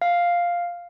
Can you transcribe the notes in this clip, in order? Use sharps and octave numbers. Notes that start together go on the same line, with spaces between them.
F5